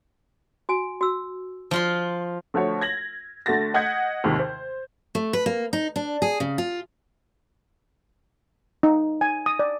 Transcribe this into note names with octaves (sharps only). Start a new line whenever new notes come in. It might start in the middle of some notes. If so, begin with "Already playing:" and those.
F#4 G#5
F#4 E6
F3 F4 C6
D3 F3 A3 F#4 C#5
G#6 A#6 F#7
D3 A3 F#4 A6 A#6
D#5 F#5 G6 G#6 B6
D#2 G#2 C3 D#3
C5
A3
B4
A#3
D#4
D4
G#4
C#3
F4
D#4
G#5
D#6
D5